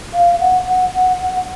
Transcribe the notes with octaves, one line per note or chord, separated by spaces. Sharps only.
F5
F#5
F#5
F#5
F#5